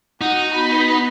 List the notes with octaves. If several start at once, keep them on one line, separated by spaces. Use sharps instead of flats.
D#4 F#4 F#5
B3 B5